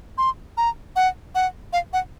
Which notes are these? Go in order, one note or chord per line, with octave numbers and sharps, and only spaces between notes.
C6
A#5
F#5
F#5
F5
F#5